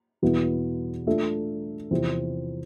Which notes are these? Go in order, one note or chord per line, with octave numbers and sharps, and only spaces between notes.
E2 B2 B3 E4
A3 D4 F4 A4 E5
E2 C3 F3 C4 E4